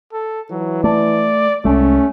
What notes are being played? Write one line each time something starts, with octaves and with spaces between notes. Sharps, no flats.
A4
E3 F#3
A3 D5
C2 G#3 A3 C#4